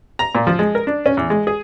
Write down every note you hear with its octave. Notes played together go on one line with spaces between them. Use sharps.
A#5
A#2
F3
G#3
A#4
D4
C#4
E2
G#3
G#4